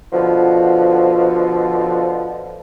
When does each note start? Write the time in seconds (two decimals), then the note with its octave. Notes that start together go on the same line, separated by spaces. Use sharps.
0.13 B2 D3 F3